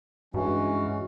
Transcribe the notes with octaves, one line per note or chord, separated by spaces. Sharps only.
G2 E3 G#3 C#4 F#4